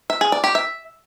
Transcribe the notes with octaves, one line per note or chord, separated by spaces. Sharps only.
E5
G#4
D5
G4
E5